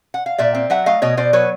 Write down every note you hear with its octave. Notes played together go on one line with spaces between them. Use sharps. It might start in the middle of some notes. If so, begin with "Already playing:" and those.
F#5
F5
A#2 D5 E5
C4
F#3 E5 F#5
A3 D#5 F5
B2 C#5 D#5
B2 C5 D5
F#3 B4 C#5